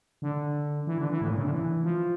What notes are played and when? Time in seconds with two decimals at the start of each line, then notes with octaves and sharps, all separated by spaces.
0.22 D3
0.87 E3
0.98 D3
1.10 E3
1.21 A2
1.28 A#2
1.36 C#3
1.44 D3
1.51 E3
1.84 F3